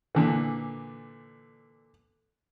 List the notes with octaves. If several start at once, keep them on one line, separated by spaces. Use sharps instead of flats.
A#2 D3 E3